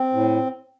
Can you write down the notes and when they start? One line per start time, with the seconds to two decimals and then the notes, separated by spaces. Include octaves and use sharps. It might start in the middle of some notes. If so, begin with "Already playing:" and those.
Already playing: C4
0.13 A2